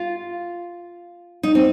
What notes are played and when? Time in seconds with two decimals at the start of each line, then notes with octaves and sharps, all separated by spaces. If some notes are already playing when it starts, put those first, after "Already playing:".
Already playing: F4
1.43 D#4
1.55 C4